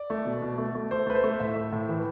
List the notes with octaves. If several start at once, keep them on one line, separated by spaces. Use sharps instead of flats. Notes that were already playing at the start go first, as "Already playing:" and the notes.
Already playing: D5
A3
B2
B2
A3
A3
A3 C5
A3 B4
C5
A3
A2 E5
A3
A2
E3